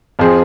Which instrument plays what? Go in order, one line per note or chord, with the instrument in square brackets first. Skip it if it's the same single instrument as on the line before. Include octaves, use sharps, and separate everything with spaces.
[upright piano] F2 F3 C4 G#4 C5